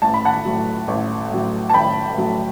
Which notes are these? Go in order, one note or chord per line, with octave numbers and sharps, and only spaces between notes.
A1 A5
B5
F#5 A5
A2 F#3
A1
A2 F#3
A5
A1 G5 B5
A2 F#3